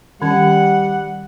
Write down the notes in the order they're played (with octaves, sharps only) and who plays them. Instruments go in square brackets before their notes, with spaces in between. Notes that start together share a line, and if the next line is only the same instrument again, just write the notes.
[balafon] D#3 C#4 [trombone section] G3 [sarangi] F#5